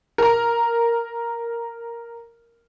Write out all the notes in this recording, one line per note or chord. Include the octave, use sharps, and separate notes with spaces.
A#4 A#5